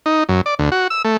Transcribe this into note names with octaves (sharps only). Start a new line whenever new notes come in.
D#4
F#2
D5
D2
F#4
E6
A3